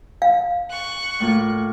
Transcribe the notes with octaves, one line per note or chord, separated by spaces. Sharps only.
F5
C#6 F#6
A2 A#3 F4